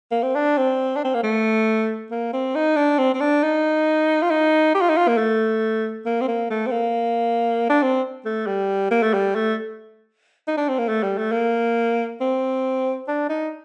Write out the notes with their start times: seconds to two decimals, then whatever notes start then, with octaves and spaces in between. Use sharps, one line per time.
0.12 A#3
0.23 C4
0.35 D4
0.58 C4
0.96 D4
1.04 C4
1.14 A#3
1.23 A3
2.11 A#3
2.33 C4
2.56 D#4
2.76 D4
2.98 C4
3.14 C4
3.20 D4
3.43 D#4
4.22 F4
4.30 D#4
4.75 G4
4.81 F4
4.89 D#4
4.97 F4
5.08 A#3
5.18 A3
6.06 A#3
6.21 C4
6.28 A#3
6.50 A3
6.67 C4
6.71 A#3
7.70 D4
7.82 C4
8.25 A3
8.47 G3
8.91 A#3
9.03 A3
9.14 G3
9.36 A3
10.48 D#4
10.57 D4
10.68 C4
10.79 A#3
10.89 A3
11.03 G3
11.18 A3
11.32 A#3
12.21 C4
13.08 D4
13.29 D#4